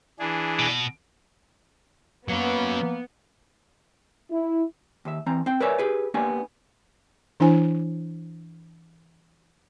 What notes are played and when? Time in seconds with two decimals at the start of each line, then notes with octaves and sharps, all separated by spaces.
0.19 E3 D4 G#4
0.59 B2
2.28 F#3 A#3 B3 C#4
4.31 E4
5.05 D#2 E5
5.26 E3 C4 A#5
5.46 C4 G5
5.60 A#4 B4 C#5 D5 E5 G#5
5.79 G4 G#4 B4
6.14 A#3 B3 D4 G4 D5 G#5
7.40 E3 D4 E4 C5 G#5